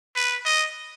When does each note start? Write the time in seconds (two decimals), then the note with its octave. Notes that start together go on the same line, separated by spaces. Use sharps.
0.16 B4
0.45 D#5